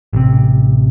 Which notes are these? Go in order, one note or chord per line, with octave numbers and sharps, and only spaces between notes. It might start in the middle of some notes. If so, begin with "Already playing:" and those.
A1 C3